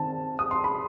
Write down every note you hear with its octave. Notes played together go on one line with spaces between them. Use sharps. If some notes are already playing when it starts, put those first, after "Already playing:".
Already playing: D#3 C4 A5
D#6
C6
B5